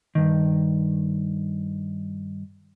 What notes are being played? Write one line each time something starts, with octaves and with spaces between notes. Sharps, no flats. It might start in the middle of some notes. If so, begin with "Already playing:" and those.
G2 D#3